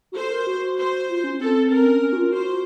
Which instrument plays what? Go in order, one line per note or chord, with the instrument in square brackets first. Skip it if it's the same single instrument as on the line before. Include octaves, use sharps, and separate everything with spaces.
[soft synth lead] F#4
[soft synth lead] A4 [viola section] C5
[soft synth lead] A#4
F#4
[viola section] C5
[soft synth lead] F4
C#4
[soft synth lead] C4 [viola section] A4
[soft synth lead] C4 [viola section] A#4
[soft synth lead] C#4
C#4
F#4
F4
[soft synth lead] F#4 [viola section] C5